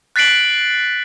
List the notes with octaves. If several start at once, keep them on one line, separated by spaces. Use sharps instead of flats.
F#6 A6 B6 C7 D7 F#7